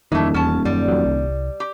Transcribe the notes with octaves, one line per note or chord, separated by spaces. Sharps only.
D#1 F2 D#3 E3 A3
E2 C#4 A5
F#2 G3
F2 F#3
C2
G4